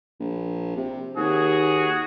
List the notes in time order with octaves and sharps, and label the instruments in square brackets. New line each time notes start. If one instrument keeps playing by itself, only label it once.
[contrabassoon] A#1
C3
[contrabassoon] D#2 [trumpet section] F#4 G#4